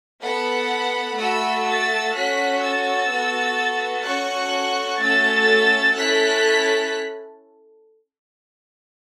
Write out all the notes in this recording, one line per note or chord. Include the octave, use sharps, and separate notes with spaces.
B3 A4 F#5 B5
A3 F#4 A4 B5 E6
E6 A6
C#4 F#4 A4 F#6 B6
E6 A6
B3 F#4 A4
C#4 F#4 A4 C#6 F#6
A3 C#4 F#4 A4 E6 A6
C#4 E4 A4 F#6 B6